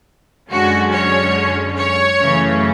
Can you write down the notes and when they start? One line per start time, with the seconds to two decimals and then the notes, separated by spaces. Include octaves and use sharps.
0.50 F#2 D3 G#3 C#4 F#4
0.93 C#5
1.77 C#5
2.21 F#2 C#3 E3 A3 C#4